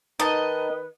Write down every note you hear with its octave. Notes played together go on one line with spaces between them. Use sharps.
D#3 D#4 B4 D#5 A5